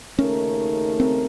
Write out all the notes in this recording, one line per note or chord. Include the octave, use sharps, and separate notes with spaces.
D#2 C#3 A3 C#4 D#4 A#4
C4